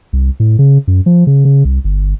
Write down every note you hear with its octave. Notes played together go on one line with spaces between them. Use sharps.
C2
A2
C#3
F#2
F3
C#3
C#3
C2
G1